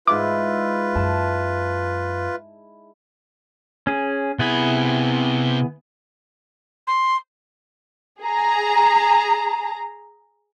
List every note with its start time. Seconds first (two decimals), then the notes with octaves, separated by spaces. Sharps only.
0.07 G#2 E4 F4 B4 D6
0.95 F#2 A5
3.87 C#4 G#4
4.39 C3 B3 E4 G#4 B5
6.87 C6
8.22 G#4 A#5